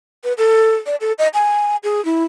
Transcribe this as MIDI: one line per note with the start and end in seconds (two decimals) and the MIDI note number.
0.24 0.33 71
0.38 0.75 69
0.86 0.95 74
1.01 1.12 69
1.19 1.28 75
1.34 1.76 80
1.84 2.03 68
2.05 2.24 64